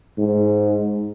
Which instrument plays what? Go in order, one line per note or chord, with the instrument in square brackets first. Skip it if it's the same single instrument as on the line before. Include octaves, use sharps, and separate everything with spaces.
[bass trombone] G#2